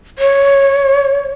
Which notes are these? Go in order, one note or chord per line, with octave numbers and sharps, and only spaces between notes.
C#5